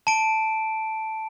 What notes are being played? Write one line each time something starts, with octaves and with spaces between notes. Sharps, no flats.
A5 D7